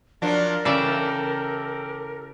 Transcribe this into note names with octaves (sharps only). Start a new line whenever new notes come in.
F3 F#3 D4 A#4
C#3 E3 G4 A4 D5 E5